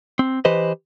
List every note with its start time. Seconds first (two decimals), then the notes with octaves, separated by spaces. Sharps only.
0.19 C4
0.45 E3 G4 B4 C5 D#5